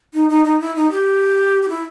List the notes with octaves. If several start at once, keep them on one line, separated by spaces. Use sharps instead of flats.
D#4
D#4
D#4
E4
D#4
G4
G4
E4